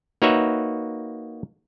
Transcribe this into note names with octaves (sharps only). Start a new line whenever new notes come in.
A#3 D#4 F#4 B4 C#5 E5